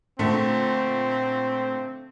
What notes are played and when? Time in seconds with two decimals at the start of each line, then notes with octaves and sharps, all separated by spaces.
0.19 A#2 D3 A3 C4